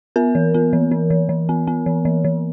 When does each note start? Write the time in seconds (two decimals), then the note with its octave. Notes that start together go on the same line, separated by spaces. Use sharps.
0.16 B3 A#4
0.35 E3
0.54 B3
0.73 E3
0.91 E3
1.10 E3
1.29 E3
1.49 B3
1.67 B3
1.86 E3
2.05 E3
2.24 E3